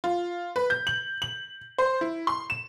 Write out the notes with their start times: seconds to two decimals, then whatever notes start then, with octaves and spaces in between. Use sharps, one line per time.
0.04 F4
0.56 B4
0.70 G6
0.87 F#7
1.22 F#7
1.78 C5
2.01 E4
2.27 C6
2.50 E7